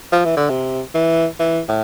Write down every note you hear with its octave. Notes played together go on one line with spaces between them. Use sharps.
F3
E3
D3
C3
E3
E3
A2